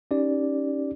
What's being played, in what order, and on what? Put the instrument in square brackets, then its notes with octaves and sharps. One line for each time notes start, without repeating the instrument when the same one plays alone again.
[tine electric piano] C#4 D#4 G4 D5